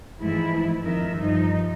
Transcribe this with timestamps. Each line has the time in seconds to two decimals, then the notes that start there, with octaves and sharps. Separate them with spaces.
0.21 G#2 E3 F3 G#3 A3 E4
0.82 F2 D#3 A#4 E5
1.16 G2 F3 D#4